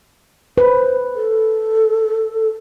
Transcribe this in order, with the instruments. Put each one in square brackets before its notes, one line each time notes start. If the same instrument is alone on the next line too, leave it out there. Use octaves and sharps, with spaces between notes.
[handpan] B4 [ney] C5
[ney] A4